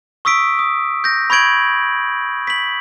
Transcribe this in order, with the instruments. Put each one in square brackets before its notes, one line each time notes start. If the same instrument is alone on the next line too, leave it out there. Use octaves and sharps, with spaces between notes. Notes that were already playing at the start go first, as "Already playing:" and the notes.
[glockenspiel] C#6 D#6 E6 B6 D7
D#6
G6 A#6
B5 C#6 G6 G#6 D7 F#7
B6 F#7